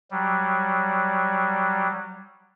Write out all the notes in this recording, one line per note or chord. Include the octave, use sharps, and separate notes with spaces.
F#3 G3